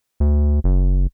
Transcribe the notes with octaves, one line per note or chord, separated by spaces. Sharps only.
D2
F#1